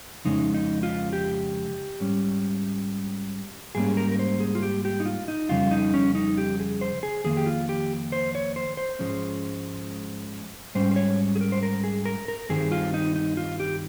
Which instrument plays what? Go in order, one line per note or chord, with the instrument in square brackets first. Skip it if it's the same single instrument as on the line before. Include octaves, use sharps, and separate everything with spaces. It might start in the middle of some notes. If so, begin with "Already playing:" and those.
[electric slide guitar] F2 C#3 G#3 C#4 D#4
D#4
F4
G4
G#2 G3 C#4
G#2 G3 A#3 C#4 G#4
A#4
A#4
C5
G#4
F4
G4
G4
D#4
F4
D#4
F2 C#3 G3 F4
D#4
C#4
D#4
G4
G#4
C5
G#4
F2 D#3 A#3 G#4
G4
F4
G4
C5
C#5
C5
C5
G#2 F3 G#3 C#4
G#2 G3 C#4 C5
C5
C#5
G#4
A#4
C5
A#4
G#4
A#4
A#4
G2 D#3 G3 C4 G#4
F4
D#4
D#4
F4
G4